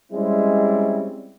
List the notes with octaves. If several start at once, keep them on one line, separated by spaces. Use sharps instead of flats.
G3 G#3 C4 C#4 E4